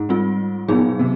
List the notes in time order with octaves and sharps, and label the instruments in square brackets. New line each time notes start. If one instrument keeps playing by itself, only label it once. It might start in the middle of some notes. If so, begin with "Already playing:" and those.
Already playing: [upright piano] G#2
[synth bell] G3 C4 F4
[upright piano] A#2 [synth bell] F#3 B3 D#4 G#4
[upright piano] B2
C3